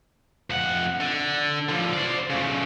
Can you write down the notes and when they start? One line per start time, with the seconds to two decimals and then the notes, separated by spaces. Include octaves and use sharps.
0.50 F2 F#5
1.01 D3
1.69 D3 F3
1.93 C5 D5
2.30 C#3 A3